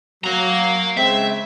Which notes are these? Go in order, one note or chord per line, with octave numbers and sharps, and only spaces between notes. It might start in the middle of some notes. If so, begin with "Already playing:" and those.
F#3 F5 A#5
C#3 G#3 C4 E5